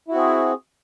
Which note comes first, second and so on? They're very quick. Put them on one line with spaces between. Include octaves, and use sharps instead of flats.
E4 F#4 C4 G#4